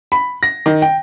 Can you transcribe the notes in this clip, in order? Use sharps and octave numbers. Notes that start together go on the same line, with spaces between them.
B5
A#6
D#3
G5